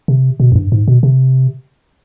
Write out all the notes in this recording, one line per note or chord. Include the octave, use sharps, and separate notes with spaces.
C3
B2
F2
G2
G#2
B2
C3